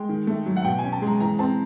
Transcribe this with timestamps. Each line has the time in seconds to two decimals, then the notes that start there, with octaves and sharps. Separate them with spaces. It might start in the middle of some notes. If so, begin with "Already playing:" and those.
Already playing: G#3 G5
0.09 D#3
0.27 A3
0.46 F#3
0.56 F#5
0.64 B2 G5
0.78 C#4 G#5
0.92 A5
1.02 G#3 A#5
1.20 E3 A#5
1.39 C4 A5